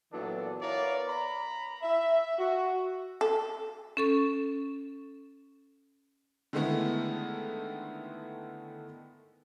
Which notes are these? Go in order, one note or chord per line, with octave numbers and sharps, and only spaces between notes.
A#2 E3 F#3 B3 D4 A4
B3 E4 A#4 C#5 D5 F5
A#5 B5
E5
F#4
A4
C#4 A4 C#6
D3 D#3 G#3 A3 B3 E4